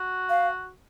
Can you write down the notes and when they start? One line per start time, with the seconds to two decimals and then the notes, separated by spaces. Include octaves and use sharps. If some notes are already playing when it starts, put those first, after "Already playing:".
Already playing: F#4
0.29 F5